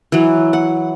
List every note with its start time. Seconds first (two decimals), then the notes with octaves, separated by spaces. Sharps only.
0.12 E3 F#3
0.53 F#5